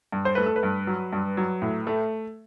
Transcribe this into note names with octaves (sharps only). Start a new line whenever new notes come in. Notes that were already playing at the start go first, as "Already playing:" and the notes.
G2
C5
A3 B4
A4
B4
G2
F#3
G2
F#3
A2
A3